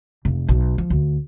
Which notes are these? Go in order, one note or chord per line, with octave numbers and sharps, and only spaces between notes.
F1
B1
F3
D2